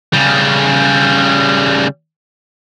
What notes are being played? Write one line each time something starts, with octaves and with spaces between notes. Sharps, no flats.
C#3 G3